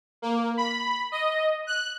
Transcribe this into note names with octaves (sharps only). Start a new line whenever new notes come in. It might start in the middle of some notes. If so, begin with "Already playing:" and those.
A#3
B5
D#5
F#6